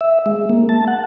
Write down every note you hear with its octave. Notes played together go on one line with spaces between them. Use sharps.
E5
G#3
A#3
A5
F#5